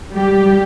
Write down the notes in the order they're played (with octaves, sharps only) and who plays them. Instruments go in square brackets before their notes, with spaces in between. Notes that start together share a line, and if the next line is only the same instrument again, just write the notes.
[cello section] G3 G4